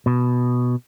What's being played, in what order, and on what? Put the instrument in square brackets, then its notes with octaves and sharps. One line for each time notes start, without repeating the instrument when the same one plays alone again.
[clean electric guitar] B2